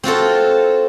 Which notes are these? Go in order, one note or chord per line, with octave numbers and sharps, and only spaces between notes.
C4 F4 F#4 A4